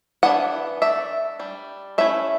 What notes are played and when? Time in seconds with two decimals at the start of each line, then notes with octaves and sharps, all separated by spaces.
0.23 E3 B3 D4 F#5
0.82 A3 D4 E5
1.39 G3 D4
1.98 A3 C#4 E4 E5